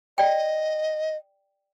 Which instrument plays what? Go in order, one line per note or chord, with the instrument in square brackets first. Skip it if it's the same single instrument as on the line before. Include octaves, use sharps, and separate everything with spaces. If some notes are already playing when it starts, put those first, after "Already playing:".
[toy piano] D5 G5 [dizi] D#5